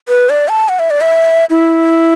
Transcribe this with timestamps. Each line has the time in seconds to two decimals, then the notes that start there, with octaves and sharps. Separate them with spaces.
0.09 B4
0.30 D5
0.49 A5
0.69 F#5
0.79 E5
0.90 D5
1.01 E5
1.50 E4